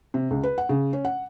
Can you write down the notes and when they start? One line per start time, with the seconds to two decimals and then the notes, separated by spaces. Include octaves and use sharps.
0.14 C3
0.31 C#2
0.43 B4
0.58 F#5
0.69 C#3
0.93 C#4
1.05 F#5